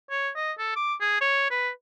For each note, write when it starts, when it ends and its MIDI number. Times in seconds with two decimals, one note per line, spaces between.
0.10 0.30 73
0.36 0.52 75
0.59 0.71 69
0.76 0.94 86
1.01 1.20 68
1.21 1.47 73
1.51 1.69 71